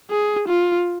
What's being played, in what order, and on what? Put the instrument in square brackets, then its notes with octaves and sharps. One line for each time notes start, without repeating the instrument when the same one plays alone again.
[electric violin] G#4
F4